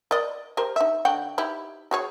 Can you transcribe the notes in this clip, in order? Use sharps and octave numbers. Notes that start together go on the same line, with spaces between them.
A#4 D5 D#5
G4 A#4 C5
D#4 E5
D3 F#4 G5
D#4 E4 G4
F#4 G#4 C#5